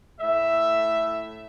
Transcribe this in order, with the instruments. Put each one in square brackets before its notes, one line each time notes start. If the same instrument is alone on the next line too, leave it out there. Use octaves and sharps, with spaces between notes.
[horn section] A2 A3 E5